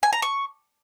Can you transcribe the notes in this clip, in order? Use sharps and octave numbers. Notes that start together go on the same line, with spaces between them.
G#5
A#5
C#6